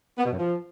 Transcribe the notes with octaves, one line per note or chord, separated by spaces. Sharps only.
B3
B2
F#2
F3